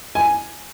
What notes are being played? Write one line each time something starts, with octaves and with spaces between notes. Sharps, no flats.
G#5